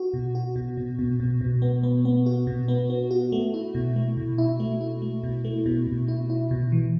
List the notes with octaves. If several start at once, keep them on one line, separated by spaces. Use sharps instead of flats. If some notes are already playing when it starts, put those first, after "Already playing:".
Already playing: F#4
B2
F#4
B2
B2
B2
B2
B2
B3
B3
B3
F#4
B2
B3
B3
F#4
A3
E4
B2
A3
B2
E4
A3
E4
A3
B2
A3
B2
B2
E4
E4
B2
E3